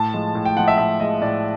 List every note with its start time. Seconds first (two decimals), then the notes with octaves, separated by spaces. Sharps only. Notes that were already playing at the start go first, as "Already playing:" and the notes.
Already playing: A2 A5
0.13 F3 G#3
0.35 A2
0.45 G5
0.56 F3 G#3 F#5
0.68 E5
0.78 A2 E5
1.00 F3 G#3 D#5
1.21 A2 D5